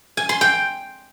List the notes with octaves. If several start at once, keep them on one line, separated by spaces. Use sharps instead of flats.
G#5
C6
G5